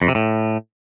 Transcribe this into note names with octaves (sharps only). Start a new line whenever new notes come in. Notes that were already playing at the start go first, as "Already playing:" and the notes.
F2
C3
A2